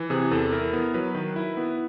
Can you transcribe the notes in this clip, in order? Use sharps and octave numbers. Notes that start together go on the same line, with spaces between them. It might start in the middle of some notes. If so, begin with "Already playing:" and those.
Already playing: E3
C3 G#4
E2 A4
E4 A#4
B3
F#3 B4
D#3
E4
B3